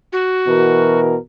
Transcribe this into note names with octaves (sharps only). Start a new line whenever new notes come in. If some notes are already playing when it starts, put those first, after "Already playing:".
F#4
B2 E3 A#4